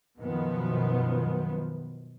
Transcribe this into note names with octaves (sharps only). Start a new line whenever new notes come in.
F#2 B2 D#3 F3 B3